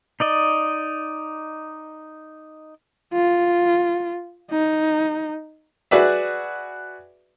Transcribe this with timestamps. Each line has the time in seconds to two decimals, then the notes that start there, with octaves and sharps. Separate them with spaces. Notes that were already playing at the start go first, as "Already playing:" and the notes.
0.20 D#4 D5 D#5
3.13 F4
4.51 D#4
5.91 F#4 G#4 B4 D5 E5